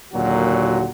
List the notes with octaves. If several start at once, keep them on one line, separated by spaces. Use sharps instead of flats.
D#2 A#2 D3 F#3 F#4